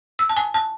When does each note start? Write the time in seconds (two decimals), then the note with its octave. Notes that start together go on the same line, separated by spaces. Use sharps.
0.19 E6
0.29 A5
0.36 G#5
0.54 A5